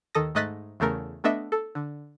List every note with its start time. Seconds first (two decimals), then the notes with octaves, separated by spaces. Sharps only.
0.15 D#2 D#3 A4 D#6 A#6
0.35 G#2 A3 D#5 F#6 A6 B6
0.80 E2 C#3 A3 A#4
1.24 A3 B3 D4 A4 D#5 E5
1.52 A4
1.75 D3